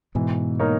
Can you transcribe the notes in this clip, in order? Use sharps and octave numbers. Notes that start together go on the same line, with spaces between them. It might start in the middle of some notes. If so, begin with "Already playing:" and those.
G#2 B2 E3
A#3 D#4 A#4 C#5